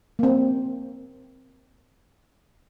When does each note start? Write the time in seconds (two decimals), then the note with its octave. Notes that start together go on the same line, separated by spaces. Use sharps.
0.19 A#3 C4